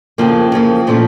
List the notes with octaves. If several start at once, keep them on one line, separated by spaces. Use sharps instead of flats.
F2 C#3 F3 A#3
F2 C#3 F3 A#3
A#2 F3 A3 C#4 F4